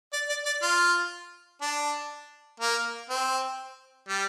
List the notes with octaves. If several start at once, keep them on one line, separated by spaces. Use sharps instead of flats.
D5
D5
D5
F4
D4
A#3
C4
G3